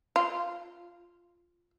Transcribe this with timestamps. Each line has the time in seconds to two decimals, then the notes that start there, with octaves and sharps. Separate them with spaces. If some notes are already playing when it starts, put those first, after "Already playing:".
0.16 F4